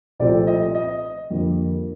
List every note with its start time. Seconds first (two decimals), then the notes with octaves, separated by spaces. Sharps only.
0.19 C2 A#2 F3 A3 C4 D5
0.47 D#5
0.75 D#5
1.30 F2 D3 G3 A#3